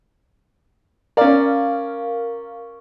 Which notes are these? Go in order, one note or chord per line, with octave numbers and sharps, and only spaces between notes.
C#4 A#4 D5 F5